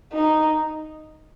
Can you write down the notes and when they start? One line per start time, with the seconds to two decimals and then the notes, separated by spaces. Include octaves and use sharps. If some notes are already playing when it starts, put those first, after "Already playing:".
0.13 D#4